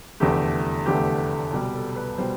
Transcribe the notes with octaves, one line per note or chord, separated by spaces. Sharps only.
F1 E2 D3 A3 G4
F1 E2 D3 A3 G4
C2 B2 G3 G4
A4
B4
B2 G3 C5